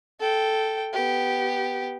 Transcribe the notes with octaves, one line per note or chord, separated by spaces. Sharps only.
A4 G5
B3 G4